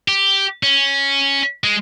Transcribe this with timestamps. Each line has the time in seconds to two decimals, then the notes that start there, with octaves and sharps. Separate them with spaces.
0.08 G4
0.63 C#4
1.64 G#3